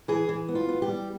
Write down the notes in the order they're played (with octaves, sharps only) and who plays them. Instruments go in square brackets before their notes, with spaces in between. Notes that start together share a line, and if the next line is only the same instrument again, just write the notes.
[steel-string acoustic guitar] E3 G#4
E3
B3
F4
B3
G4
G3